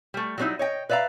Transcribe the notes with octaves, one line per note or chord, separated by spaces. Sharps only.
G3 A3
F#3 G3 A3 C4 D#4 E4
C#5 D#5 G5
B4 D5 E5 F5 A#5